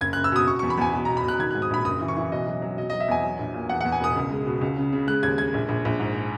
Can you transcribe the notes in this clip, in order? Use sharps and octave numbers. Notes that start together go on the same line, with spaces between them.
F#1 G#6
F#1 F#6
E6
B2 D#6
B2 C#6
E2 C#6
B5
E2 G#5
B1
B1 A#5
B5
B1
F#6
D#3 G#6
G#2 F#6
D#6
A#1 B5
F#1 D#6
E3
C#6
E3
B1 D#5
F#3
F#3
B2 D#5
F#3 D#5
E5
E2 G#5
F#3
A#1
A#2
E2 F#5
E2 F#5
G#5
E1 D#6
C#2
G#3
B2
C#2
C#3
C#3
G#3 F#6
D#2 G#6
G#3 G#6
A#1
A#1
A#1
G#2